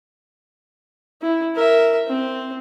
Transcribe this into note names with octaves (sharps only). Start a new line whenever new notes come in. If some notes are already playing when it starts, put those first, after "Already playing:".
E4
A#4 E5
C4